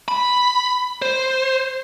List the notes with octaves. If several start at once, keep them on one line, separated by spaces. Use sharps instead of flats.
B5
C5